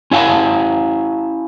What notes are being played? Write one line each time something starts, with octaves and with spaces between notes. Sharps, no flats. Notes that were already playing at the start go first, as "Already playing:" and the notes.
C#4 E4 F5 F#5 A5